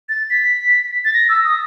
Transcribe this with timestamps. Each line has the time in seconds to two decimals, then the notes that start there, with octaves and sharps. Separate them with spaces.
0.09 A6
0.30 B6
1.05 A6
1.14 A#6
1.29 E6
1.45 D#6